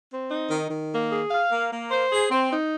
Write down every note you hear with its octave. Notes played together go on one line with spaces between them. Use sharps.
C4
D#4
D#3
D#3
A#3
G#4
F5
A#3
A#3
C5
G#4
C4
D#4